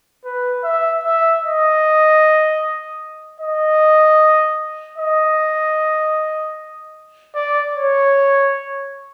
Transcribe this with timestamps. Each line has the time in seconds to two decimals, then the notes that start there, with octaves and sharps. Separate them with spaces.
0.25 B4
0.64 E5
1.04 E5
1.43 D#5
3.41 D#5
4.98 D#5
7.35 D5
7.75 C#5